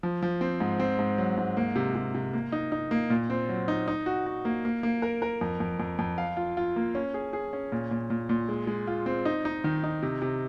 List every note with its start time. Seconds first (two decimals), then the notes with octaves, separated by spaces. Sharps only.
0.03 F3
0.23 F3
0.41 C4
0.60 G#2
0.80 C4
0.99 G#2
1.18 F#3
1.38 G#2
1.57 A#3
1.76 C3
1.95 C3
2.14 C3
2.33 A#3
2.52 D#4
2.72 D#4
2.91 A#3
3.10 A#2
3.30 C4
3.49 F#3
3.68 D#4
3.88 D#4
4.06 F#4
4.26 F#4
4.45 A#3
4.65 A#3
4.83 A#3
5.02 A#4
5.22 A#4
5.41 F2
5.60 F2
5.80 F2
5.99 F2
6.18 F5
6.37 F4
6.57 F4
6.76 A#3
6.95 C#4
7.14 G#4
7.33 G#4
7.53 C#4
7.72 A#2
7.91 A#2
8.10 A#2
8.29 A#2
8.49 G#3
8.67 G#3
8.87 F4
9.06 C4
9.25 D#4
9.45 D#4
9.64 D#3
9.84 D#4
10.03 C3
10.22 C3